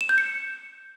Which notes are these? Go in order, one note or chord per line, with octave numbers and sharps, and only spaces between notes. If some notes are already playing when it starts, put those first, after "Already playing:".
E7
G6
C#7